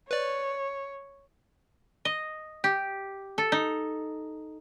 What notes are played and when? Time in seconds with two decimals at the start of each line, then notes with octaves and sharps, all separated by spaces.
0.11 B4 C#5 D5
2.05 D#5
2.64 G4
3.38 A4
3.52 D#4